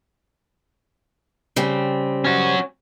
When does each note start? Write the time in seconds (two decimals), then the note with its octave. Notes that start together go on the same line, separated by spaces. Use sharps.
1.56 C#3 G3 C4
2.24 C#4 F#4